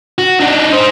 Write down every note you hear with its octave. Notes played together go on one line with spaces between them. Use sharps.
F#4
D4 D#4
D#4 C5